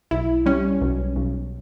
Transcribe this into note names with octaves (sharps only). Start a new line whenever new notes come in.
B1 E4
G3 C#4
B1
B1